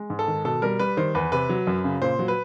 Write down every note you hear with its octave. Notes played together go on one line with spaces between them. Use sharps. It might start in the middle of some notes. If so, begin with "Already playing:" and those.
Already playing: G#3
G#2
A4
D#3
B2 A4
G3 A#4
G3 B4
D#3 C5
E2 B4
C3 B4
F#3
F#2
C#3
A#2 C5
F#3
B4